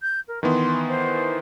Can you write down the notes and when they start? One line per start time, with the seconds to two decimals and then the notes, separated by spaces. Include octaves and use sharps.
0.01 G6
0.28 A#4
0.43 D#3 E3 B3 C6
0.88 C5